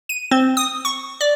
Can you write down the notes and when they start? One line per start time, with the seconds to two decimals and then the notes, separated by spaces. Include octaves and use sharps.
0.09 D#7
0.31 C4
0.57 D#6
0.85 C#6
1.21 D5